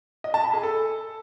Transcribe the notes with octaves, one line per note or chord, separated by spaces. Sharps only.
D#5
A5
B5
G#4
A4